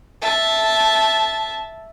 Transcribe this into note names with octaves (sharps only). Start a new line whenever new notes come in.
E5 A5